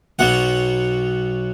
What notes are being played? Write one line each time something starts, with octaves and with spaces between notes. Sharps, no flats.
B1 B2 F#3 F#5